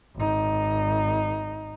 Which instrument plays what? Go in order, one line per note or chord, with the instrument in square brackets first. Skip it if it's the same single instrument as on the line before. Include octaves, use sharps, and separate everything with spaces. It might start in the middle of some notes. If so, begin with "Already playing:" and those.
[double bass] G#1 D#4